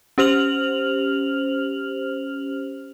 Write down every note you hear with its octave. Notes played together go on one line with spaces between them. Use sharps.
C#4 G4 C5 F6 F7 F#7